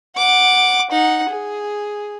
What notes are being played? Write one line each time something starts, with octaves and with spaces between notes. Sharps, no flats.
F#5 D6
D#4 F#5
G#4